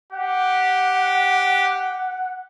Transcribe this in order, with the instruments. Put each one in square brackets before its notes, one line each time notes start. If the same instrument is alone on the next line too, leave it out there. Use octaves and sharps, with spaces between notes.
[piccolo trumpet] G4 [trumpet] F#5